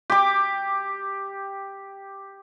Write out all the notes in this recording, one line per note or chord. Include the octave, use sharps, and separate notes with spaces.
G4 D6